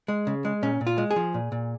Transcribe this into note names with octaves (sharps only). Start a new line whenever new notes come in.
G#3
C#3
G#3
A#2 C#4
A#2
F4
G#3
G#4
F3
A#2
A#2